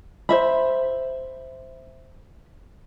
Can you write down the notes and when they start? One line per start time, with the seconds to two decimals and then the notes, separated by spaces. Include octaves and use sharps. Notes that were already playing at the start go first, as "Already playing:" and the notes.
0.29 C5 E5 B5